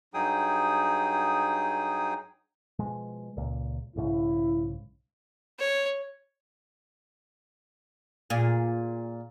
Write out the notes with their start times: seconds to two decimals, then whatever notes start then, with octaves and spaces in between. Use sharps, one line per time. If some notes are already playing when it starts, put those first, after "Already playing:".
0.14 G2 F#3 D#4 G#4 G5 D#6
2.79 B2 F3 G#3
3.37 C#2 A#2
3.96 B1 G#2 C#3 E4
5.59 C#5
8.30 A#2 G#4